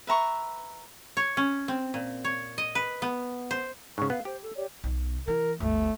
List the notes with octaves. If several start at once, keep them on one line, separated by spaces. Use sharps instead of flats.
B4 E5 A#5 C#6
C#5
C#4
C4
A#2
C#5
D#5
B4
B3
C5
G#2 C#3 C#6
B3 F5
G4 C5
A4
G4 C#5 D5
B1 B2
E3 A#4
G1 D2 A3